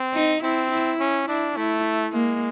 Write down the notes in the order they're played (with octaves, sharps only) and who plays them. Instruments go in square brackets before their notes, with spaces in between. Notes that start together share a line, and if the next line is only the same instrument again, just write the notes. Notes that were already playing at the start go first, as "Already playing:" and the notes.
Already playing: [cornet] C4
[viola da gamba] D#4
[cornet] C4 [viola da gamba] E4
[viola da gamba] E4
[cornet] C#4
[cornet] D4 [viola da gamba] E4
[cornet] A3 [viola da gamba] E4
[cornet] G#3 [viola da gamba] A#3